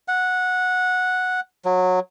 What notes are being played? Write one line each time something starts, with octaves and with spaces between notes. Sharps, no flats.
F#5
F#3